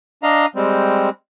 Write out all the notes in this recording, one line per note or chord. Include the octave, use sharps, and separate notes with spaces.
D4 D#5 F5 A#5
G3 G#3 C4